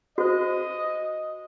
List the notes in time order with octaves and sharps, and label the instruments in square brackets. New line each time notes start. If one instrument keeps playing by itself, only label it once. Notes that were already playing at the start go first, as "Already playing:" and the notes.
[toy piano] F#4 C5 [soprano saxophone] D#5